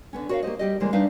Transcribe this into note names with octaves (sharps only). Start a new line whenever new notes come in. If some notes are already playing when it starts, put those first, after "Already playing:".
D3 B3 C#4
F#4 A#4 C#5 D5 E5 F5
A#3 G4 C5 D#5
G3 G4 D#5
C#3 E3 G3 G#3 A#3 C5
G3 D4 D#4 B4 E5 F5